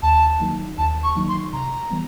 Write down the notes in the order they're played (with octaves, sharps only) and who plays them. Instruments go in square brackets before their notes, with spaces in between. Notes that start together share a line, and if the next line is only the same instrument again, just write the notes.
[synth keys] D#2 [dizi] A5
[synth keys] D#3 F#3 A#3 D#4
[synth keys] D#2 [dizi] A5
[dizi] C#6
[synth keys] D#3 F#3 A#3 D#4
[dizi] C6
[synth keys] C3 [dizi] A#5
[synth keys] E3 G3 B3